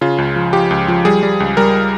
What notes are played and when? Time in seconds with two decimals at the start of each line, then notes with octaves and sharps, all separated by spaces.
0.01 C#3 F4
0.18 C#2
0.36 F3
0.53 F3 G4
0.71 C#2
0.88 F3
1.05 G3 G#4
1.23 G3
1.40 C#2
1.57 G3 A#4